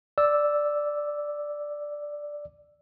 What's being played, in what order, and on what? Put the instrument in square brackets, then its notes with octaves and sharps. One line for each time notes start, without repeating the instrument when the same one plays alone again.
[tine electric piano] D5 E6